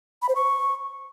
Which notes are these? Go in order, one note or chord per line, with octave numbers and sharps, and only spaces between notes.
B5
C5
C#6